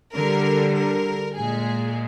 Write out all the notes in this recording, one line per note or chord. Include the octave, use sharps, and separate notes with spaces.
D3 G3 A#4
A#4
A#2 G#3 G#4